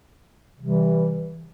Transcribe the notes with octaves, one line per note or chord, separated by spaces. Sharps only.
C3 E3 G3